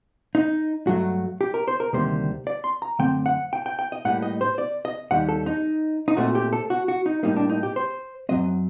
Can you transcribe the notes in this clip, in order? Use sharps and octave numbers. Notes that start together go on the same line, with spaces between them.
D#4
G2 F#3 A3 F#4
G4
A#4
C5
A#4
D2 C3 D#3 G3 A#3 C5
D5
C6
A#5
F#2 D3 A3 C4 G5
F#5
G5
G5
G5
D#5
A2 G3 A#3 F#5
D#5
C5
D5
D#5
D#2 D#3 G3 F#5
A4
D#4
D#4
A#2 A3 C4 F#4
G4
A4
F#4
F#4
D#4
A2 G3 A#3 D#4
D4
D#4
G4
C5
F#2 D#3 F#3 C4 D#5